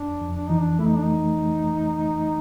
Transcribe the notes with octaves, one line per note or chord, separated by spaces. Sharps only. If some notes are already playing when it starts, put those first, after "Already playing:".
Already playing: F2 D4
F2
D4
E3 D#4
D4
A3 E4
D#4
D4
D#4